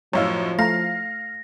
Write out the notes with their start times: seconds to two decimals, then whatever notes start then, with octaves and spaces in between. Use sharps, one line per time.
0.13 F#2 A2 F3 D#4 C#5 E5 F5
0.59 A3 F5 A#5 A#6